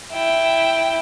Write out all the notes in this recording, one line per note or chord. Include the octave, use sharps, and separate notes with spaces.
E4 G5